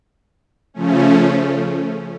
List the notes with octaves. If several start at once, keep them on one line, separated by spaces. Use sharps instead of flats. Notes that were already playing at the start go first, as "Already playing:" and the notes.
C#3 F3 A3 C#4